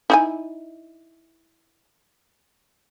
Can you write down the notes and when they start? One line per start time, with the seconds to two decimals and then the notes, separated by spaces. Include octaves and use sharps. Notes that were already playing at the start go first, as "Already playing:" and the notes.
0.10 D#4 E4 G#5